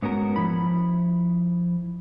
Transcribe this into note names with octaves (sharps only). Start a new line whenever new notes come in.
G#2 B3 C#4 F#4 A#4
F3 E4 B5